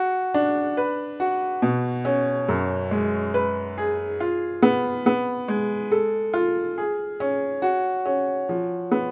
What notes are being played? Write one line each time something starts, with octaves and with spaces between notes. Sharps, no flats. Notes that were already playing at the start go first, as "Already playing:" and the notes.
Already playing: F#4
D4
B4
F#4
B2
C#4
F#2
G#3
B4
G#4
F4
B3
B3
G#3
A4
F4
G#4
C#4
F#4
C#4
F3
B3